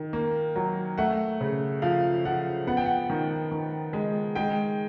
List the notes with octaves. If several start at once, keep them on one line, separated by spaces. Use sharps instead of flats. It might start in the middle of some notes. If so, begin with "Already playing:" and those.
Already playing: D#3
A#3
F#3
A3 F#5
C#3
F3 F5
F3 F#5
B3 F#5
G5
F#5
D#3
D#3
G#3
G#3 G5